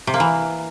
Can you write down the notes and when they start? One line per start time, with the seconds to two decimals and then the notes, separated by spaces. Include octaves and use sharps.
0.07 C3
0.14 A#3
0.20 E3